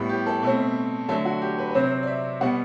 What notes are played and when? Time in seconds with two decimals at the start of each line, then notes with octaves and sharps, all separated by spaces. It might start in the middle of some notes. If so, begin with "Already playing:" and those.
Already playing: A2 G3 B3
0.09 G4
0.27 A4
0.43 B2 A3 C4
1.08 D3 F#3 A3 A4
1.25 F#4
1.42 G4
1.58 B4
1.70 B4
1.75 C3 F#3 C4 C5
2.03 D5
2.07 E5
2.41 B2 G3 B3 F#5